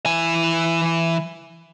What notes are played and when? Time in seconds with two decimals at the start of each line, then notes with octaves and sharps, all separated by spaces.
0.06 E3 G#5